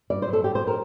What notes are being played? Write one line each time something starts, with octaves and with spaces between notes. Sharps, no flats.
G2 D5
C5
F#3
A4
G2 G4
C5
F#3
A#4